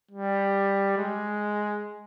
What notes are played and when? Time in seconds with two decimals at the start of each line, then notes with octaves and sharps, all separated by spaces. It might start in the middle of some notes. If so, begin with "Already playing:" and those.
0.11 G3
0.98 G#3